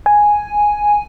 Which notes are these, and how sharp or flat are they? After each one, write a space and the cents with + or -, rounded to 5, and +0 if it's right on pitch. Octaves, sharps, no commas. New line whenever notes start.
G#5 +0